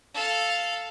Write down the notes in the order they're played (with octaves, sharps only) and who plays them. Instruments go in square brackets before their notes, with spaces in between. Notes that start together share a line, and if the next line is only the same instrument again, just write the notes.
[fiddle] A4 F5